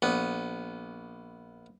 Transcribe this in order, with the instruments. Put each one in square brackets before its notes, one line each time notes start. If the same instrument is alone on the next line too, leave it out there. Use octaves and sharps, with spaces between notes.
[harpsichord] A#1 B3